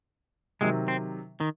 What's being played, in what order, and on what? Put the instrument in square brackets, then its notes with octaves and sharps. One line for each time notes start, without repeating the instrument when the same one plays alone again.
[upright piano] C3 D#3 F#3 [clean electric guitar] G#3
[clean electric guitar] C4
D#3